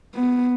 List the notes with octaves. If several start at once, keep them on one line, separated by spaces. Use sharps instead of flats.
B3